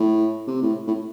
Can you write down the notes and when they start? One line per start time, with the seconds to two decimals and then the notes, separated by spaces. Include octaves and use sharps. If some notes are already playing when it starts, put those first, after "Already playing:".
Already playing: A2
0.47 C3
0.62 A2
0.87 A2